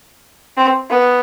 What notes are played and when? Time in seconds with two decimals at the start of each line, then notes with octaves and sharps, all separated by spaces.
0.57 C4
0.90 B3